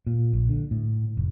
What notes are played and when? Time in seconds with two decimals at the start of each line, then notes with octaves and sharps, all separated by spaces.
0.07 A#2
0.33 A#1
0.49 D3
0.71 A2
1.17 F1